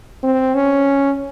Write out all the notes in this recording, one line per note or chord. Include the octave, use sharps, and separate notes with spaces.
C4
C#4